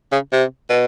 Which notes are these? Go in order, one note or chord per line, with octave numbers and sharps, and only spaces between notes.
C#3
C3
B2